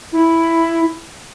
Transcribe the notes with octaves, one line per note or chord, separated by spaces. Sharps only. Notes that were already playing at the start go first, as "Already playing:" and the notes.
E4